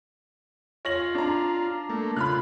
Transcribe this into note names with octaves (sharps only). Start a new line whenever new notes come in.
F4 C#5 A#6 F#7
D4 A#5
A3 A#3
C#3 F4 B5 F6 F#6